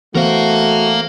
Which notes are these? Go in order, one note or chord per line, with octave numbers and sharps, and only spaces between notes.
E3 A3 B3 F#4 A#4 C5 F5